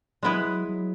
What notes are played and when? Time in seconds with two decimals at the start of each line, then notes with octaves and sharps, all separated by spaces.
0.23 F#3 G#3 B3 E4 B4
0.45 F#3
0.68 F#3